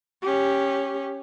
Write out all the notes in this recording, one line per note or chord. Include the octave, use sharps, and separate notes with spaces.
C#4 G4